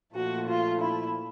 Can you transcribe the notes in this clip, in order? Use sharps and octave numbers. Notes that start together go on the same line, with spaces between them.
A#2 F3 A3 F#4
F4
E4